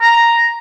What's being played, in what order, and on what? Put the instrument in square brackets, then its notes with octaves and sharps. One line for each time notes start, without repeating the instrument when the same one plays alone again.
[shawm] A#5